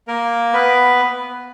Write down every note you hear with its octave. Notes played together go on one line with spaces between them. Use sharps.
A#3 A#4
B3 B4